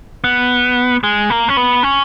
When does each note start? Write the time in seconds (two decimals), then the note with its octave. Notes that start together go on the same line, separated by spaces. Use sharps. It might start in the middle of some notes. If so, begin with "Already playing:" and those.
0.24 B3
1.04 G#3
1.30 A#3
1.49 C#4
1.57 B3
1.83 C#4